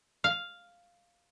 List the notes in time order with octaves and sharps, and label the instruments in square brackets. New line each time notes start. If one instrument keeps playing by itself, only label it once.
[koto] F5